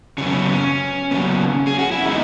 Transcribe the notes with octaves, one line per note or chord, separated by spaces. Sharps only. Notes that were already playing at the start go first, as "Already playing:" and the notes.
C#3 F#3 B3 C#4
C#3 F#3 B3
G#4
F#4
E4
D#3 G#3 B3 D#4